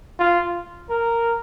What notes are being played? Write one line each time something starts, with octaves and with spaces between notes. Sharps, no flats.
F4
A#4